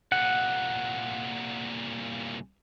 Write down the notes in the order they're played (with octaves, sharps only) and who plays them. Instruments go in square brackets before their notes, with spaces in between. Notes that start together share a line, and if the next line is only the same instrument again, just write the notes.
[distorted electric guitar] C2 A#2 [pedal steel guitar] F#5